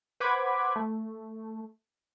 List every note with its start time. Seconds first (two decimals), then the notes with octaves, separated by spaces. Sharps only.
0.20 B4 C5 F#5 B5 D6 G#6
0.76 A3